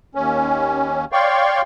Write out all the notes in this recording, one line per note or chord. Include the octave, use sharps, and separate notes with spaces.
D#2 C#4
C#5 D5 F5 G5 C6 C#6